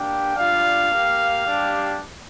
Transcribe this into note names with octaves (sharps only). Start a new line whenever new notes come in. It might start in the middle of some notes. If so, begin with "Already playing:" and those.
Already playing: A#3 D4 G4 G5
G3 D4 F4 F5
A#3 G4
G3 D4 G4